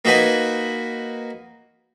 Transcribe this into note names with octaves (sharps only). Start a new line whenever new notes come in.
A#3 D#4 F#4 B4 G#5